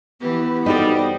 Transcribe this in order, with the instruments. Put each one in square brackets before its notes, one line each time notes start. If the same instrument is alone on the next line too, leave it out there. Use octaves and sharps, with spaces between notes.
[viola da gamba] E3 G4 [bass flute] B3
[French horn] G3 [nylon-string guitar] D#4 F#4 A4 [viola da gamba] C5 D#5